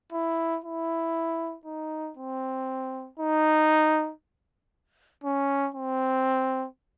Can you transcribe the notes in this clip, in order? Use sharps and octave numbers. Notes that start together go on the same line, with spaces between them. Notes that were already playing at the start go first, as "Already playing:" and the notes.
E4
E4
D#4
C4
D#4
C#4
C4